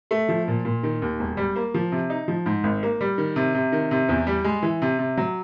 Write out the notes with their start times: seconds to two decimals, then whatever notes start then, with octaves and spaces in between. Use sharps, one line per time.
0.11 A3
0.29 F3
0.48 A#2
0.65 A#2
0.83 D#3
1.02 D#2
1.20 E1
1.37 G3
1.56 A#3
1.74 F3
1.92 C3
2.10 D#4
2.28 F3
2.46 G#2
2.64 G#1
2.83 A#3
3.01 G3
3.18 D#3
3.36 C3
3.55 C3
3.72 D#3
3.91 C3
4.09 E2
4.27 G3
4.44 G#3
4.63 E3
4.82 C3
4.99 C3
5.17 F#3